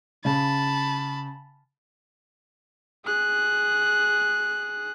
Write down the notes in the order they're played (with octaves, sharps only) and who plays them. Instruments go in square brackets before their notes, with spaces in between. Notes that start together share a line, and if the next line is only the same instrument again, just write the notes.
[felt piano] C#3 [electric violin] A5 B5
[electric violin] G#4 F#6